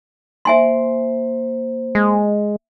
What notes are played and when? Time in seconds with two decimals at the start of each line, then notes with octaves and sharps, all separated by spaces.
0.45 A#3 C5 E5 G#5 C6
1.95 G#3